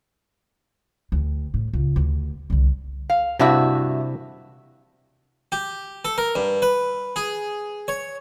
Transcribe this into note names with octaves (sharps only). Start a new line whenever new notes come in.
D2
A2
C#2
D2
C2 D3
F5
G2 C3 D4 E4 F#4 E5
G4
A4
A#4
G2
B4
G#4
C#5